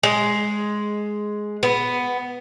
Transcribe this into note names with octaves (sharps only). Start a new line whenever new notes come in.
G#3
B3